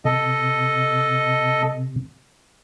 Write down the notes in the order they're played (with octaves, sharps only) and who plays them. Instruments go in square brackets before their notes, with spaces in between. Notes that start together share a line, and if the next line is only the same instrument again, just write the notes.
[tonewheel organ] C3 [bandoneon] A4 D#5